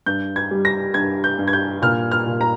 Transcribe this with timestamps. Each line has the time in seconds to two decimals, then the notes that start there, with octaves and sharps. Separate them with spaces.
0.06 G2 G6
0.36 G#6
0.51 G3
0.65 A#6
0.94 G2 G#6
1.24 G6
1.39 G2
1.48 G#6
1.53 G6
1.82 A#2 F6
2.11 F6
2.26 A#2
2.41 A#5